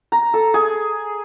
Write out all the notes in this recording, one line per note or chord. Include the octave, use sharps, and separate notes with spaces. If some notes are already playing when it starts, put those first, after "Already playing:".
A#5
A4
G#4